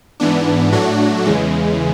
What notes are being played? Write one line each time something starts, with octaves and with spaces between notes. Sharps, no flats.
G#2 E3 B3 D4
A2 F#3 A3 D4 F#4
E2 C#3 E3 G#3